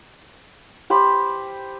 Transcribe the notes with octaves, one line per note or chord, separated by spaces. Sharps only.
G4 C5 B5